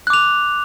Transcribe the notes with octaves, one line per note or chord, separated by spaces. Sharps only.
D6 F#6 F7